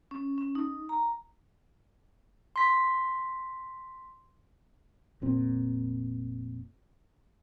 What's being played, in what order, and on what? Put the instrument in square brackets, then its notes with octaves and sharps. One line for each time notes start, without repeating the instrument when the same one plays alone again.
[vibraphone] C#4
C#4
D#4
A#5
[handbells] C6 B6
[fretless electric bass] F1 A#2 C4